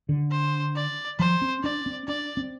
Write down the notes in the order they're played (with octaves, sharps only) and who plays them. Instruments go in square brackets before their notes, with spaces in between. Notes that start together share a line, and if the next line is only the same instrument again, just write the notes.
[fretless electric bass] D3
[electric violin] C5
D5
[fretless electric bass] F3 [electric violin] C5
[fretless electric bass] C4
[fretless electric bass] D4 [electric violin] D5
[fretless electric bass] C4
[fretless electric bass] D4 [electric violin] D5
[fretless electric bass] C4